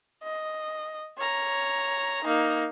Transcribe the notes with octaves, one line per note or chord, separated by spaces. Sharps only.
D#5
C#5 A#5
A#3 D#4